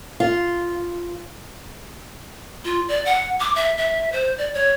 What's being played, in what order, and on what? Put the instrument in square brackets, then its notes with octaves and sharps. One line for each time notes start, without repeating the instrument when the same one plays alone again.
[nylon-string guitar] F4
[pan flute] F4
D5
F#5
D6
E5
E5
C5
D5
C#5